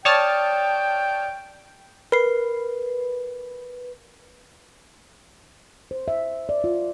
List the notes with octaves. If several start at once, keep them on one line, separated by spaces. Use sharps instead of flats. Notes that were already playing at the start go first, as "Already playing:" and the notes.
C#5 D5 G5 A5 D#6 F6
A#4 B4 C7
C5
E5
D5
F4